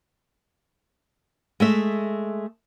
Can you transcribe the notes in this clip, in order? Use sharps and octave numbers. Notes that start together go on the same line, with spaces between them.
G#3 A3 E5